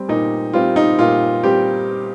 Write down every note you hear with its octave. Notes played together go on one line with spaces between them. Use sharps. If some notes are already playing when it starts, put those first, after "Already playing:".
Already playing: G3 C4
A#2 D#4
G3 C4 F4
D#4
A#2 F4
G3 C4 G4